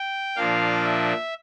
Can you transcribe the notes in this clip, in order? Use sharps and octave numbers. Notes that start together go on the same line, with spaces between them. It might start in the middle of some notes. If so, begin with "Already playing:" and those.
Already playing: G5
A#2 F3 A#3 D4 F5
E5